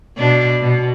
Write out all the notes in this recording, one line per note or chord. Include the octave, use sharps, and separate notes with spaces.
B2 D4
B2